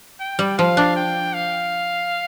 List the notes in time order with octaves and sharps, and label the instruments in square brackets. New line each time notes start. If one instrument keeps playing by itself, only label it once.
[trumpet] G5
[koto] G3
[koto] F3 [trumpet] F5
[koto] D4
[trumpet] G5
F5